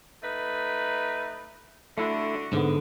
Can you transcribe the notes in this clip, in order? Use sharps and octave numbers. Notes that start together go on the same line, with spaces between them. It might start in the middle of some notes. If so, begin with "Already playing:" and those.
A3 D#4 B4
D3 A3 D4 E4 F#4
G#2 D3 B3